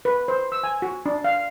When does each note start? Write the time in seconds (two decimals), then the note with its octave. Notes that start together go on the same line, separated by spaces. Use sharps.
0.05 B4
0.28 C5
0.52 E6
0.64 G#5
0.82 F#4
1.06 D4
1.24 F5